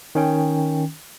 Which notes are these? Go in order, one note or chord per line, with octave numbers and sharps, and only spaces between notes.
D#3 C#4 G5